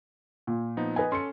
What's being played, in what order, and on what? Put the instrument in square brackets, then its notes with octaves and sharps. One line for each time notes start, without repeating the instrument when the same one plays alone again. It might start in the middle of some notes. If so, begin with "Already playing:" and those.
[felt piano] A#2
[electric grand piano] F3 B3 D#4
[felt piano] B4 D#5 G#5
[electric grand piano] C#4 A4 [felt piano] C6 C#7